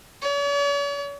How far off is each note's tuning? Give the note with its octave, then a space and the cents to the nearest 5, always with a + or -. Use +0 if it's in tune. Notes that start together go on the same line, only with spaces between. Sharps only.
C#5 +45